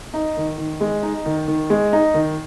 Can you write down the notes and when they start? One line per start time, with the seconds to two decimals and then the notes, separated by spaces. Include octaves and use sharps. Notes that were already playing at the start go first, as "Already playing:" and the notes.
0.14 D#4
0.37 D#3
0.58 D#3
0.81 G#3
1.03 D#4
1.26 D#3
1.48 D#3
1.70 G#3
1.93 D#4
2.14 D#3